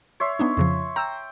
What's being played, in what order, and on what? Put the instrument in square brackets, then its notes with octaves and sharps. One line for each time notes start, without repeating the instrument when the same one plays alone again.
[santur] C#5 E5 C6
[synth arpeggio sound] B3 D4 D#4
F2 C#3 F3
[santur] G5 [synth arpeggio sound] A#5 E6